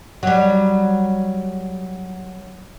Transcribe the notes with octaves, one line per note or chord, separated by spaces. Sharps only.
F#3 G3